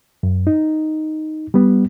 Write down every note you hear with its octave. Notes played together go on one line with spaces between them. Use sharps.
F#2
D#4
G3 B3